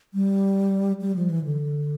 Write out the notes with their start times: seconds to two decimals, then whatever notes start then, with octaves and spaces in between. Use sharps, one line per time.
0.14 G3
1.01 G3
1.16 F3
1.30 E3
1.44 D3